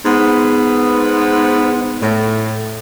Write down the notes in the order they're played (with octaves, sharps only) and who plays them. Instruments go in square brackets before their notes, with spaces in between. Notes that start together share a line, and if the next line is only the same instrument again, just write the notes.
[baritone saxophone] G#2 [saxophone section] B3
[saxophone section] A2